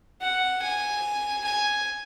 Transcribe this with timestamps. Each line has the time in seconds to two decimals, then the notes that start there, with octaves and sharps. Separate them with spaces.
0.21 F#5
0.62 G#5
1.45 G#5